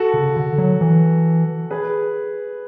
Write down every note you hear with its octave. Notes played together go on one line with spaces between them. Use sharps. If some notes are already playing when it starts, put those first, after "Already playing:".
Already playing: F#4 A4
C#3
D3
F#3
E3
G#4 B4